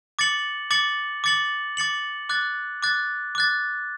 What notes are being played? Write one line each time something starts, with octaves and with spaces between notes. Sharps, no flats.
D6 A6 C#7 F#7
D6 A6 C#7 F#7
D6 A6 C#7 F#7
D6 A6 C#7 F#7
D6 F#6 A6
D6 F#6 A6
D6 F#6 A6